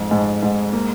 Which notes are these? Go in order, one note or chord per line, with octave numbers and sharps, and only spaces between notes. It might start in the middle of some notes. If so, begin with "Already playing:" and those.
Already playing: F2 G#2
G#2
G#2
A#3